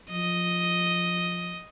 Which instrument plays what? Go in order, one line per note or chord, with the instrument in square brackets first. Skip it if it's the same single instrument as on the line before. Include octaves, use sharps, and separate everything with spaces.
[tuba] F3 [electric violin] D#5